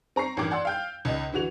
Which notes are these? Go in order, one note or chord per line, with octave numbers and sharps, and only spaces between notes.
C4 A#5 C#6 C7
A1 G2 D#3 G5 D6 G#6
D5 F#5 C6 E6
F5 G5 G6
C#2 D#4 D#5
D3 E3 F#4 F7